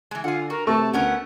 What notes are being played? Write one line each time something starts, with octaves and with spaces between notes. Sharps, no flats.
E3 G#3
D3 F4 F#5 G#5
F#4 A#4
C3 A3 A5 C#6
D2 B3 C#4 A#4 F#5